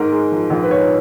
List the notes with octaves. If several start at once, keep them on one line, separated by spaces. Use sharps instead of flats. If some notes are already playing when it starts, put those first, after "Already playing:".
Already playing: G#2 A#4
G#3
F3
A#1
B4
G#2 C#5